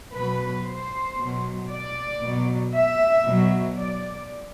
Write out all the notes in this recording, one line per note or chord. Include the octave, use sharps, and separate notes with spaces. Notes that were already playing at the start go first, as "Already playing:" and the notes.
B2 F#3 B4
C5
B2 F#3
D5
B2 F#3
E5
B2 F#3
D5